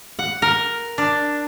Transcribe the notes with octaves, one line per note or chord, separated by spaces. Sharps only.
F#5
A#4
D4